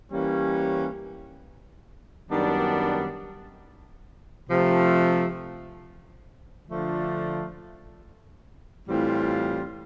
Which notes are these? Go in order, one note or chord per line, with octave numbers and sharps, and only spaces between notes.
E3 G3 A#3 C#4
F#2 D#3 G3 B3 D4
C3 F3 A3
D3 F3 A3 D4 F4
A2 E3 G3 C4 F4